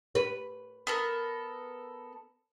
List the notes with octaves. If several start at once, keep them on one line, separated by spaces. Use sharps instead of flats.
B4
B3 A4 A#4